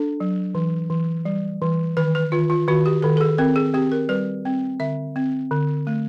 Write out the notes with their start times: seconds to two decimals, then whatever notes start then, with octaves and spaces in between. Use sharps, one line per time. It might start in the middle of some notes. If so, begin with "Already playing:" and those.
Already playing: D4 A4
0.20 F#3
0.55 E3
0.90 E3
1.25 G3
1.62 E3
1.97 D#3 B4
2.15 B4
2.32 D#3 F4
2.50 F4
2.68 D#3 F#4
2.86 G4
3.02 D#3 A4
3.17 A4
3.21 G#4
3.38 C4 A#4
3.56 G#4
3.74 C4 G4
3.92 A#4
4.09 G3 B4
4.45 C4
4.80 D3 E5
5.16 C4
5.51 D3
5.87 A3